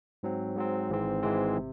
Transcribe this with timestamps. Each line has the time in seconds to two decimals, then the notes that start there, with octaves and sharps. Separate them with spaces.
0.23 G#2 F#3 C4
0.56 G#2 F#3 C4
0.90 G#1 G#2 E3 G#3 C4
1.23 G#1 G#2 E3 G#3 C4
1.57 C3